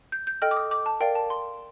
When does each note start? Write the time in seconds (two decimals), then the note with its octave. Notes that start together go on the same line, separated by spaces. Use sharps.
0.12 G6
0.27 G6
0.42 A4 D#5 G5 F6
0.51 D6
0.56 D#6
0.71 D6
0.86 A5
1.00 A#4 D5 F5 G5
1.15 A5
1.30 C6